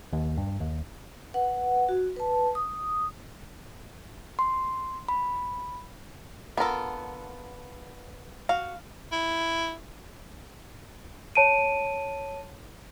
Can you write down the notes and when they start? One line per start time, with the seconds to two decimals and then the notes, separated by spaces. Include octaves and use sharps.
0.13 D#2
0.37 G2
0.61 D#2
1.34 B4 F#5
1.89 F#4
2.16 B4 A5
2.55 D#6
4.39 C6
5.09 B5
6.57 D3 B3 F4 A4 A#4
8.49 F#4 F5
9.12 E4
11.35 C#5 A5 D7 D#7